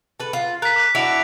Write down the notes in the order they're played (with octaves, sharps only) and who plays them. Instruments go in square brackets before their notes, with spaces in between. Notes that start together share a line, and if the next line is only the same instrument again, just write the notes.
[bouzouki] A4 B4
F4
[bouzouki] A#4 [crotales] F#6 B6
[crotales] D6 F#6
[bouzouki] D4 E4 F#4 [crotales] D7 F7